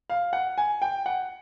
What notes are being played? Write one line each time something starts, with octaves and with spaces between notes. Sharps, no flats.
F5
F#5
G#5
G5
F#5